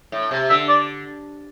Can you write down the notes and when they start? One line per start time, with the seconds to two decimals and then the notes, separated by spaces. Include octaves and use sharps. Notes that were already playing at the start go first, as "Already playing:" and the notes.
0.12 A2
0.31 C3
0.50 D3 E5
0.69 D5